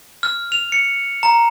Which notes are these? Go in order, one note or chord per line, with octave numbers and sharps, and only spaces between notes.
F6
F7
C#7
A#5